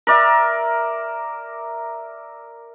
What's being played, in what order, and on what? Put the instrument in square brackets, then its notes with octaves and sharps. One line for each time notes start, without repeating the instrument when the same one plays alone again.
[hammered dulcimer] A#4 D5 E5